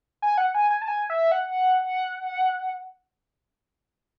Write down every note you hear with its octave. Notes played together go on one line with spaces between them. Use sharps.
G#5
F#5
G#5
G#5
A5
G#5
E5
F#5